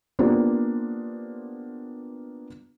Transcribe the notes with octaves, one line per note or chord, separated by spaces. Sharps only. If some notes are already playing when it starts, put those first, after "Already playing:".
A#3 B3 D4 F4 G4 C5